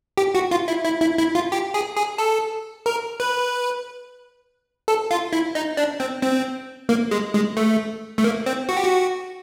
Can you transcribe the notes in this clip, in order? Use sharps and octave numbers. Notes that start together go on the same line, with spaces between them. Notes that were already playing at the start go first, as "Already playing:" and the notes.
G4
F#4
F4
E4
E4
E4
E4
F4
G4
G#4
G#4
A4
A#4
B4
A4
F4
E4
D#4
D4
C4
C4
A#3
G#3
G#3
A3
A3
A#3
C4
F#4
G4
F#4